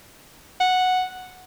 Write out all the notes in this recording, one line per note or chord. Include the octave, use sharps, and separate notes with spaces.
F#5